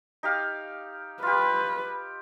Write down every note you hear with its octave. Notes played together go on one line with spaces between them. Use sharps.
D#4 G4 F5
F4 G4 B4